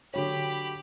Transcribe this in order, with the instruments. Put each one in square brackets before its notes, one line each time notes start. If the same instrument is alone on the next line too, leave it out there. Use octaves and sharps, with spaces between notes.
[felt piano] D3 F#3 C#5 [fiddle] G4 B5